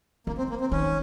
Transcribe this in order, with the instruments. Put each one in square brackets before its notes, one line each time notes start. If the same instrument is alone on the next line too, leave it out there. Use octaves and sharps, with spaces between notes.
[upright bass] C#3 [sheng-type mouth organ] A#3
[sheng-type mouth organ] C4
A#3
C4
[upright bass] D#3 [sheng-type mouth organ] C#4